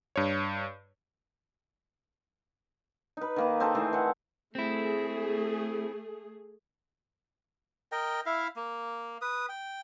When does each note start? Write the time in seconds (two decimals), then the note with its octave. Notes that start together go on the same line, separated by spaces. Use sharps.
0.16 G2 C#5
3.17 D#4 B4
3.36 D#3 A#3 B4
3.60 C4 A4 A#4
3.75 E3 A3 G#4
3.93 D#3 F#5
4.55 A3 C4 E4 G#4
7.92 A#4 D#5 G5
8.26 E4 E5 F5
8.56 A#3
9.22 B4 D#6
9.49 G5